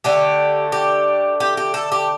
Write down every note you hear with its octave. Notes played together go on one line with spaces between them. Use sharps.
D3 A3 G4
G4
G4
G4
A4
G4